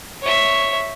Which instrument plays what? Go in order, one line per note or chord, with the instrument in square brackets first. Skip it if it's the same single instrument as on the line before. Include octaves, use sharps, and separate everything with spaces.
[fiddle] C#5 E5